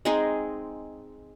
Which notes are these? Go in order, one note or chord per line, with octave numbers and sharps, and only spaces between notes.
G#3 C4 D#4 G#4